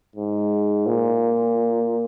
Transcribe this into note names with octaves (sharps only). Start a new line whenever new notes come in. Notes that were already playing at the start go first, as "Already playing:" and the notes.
G#2
A#2